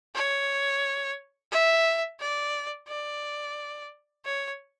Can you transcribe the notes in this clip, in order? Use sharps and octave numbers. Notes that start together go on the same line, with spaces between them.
C#5
E5
D5
D5
C#5